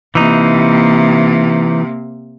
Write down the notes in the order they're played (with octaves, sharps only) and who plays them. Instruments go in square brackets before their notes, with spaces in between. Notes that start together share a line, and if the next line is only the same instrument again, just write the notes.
[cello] C3 A#3 [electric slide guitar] E3 D#4